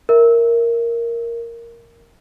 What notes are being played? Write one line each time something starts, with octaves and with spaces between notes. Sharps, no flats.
A#4 E5